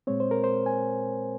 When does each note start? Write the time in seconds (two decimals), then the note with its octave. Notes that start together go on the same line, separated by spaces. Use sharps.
0.07 A#2 G#3 C4 C#5
0.20 C5
0.31 A#4
0.44 C5
0.66 G#5